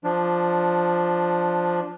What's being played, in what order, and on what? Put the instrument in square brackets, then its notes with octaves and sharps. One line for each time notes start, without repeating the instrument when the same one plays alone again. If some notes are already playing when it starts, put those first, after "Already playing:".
[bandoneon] F3 D4